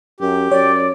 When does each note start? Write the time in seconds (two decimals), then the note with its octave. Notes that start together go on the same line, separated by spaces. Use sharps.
0.20 F#2 G4
0.52 F#2 C#5 D5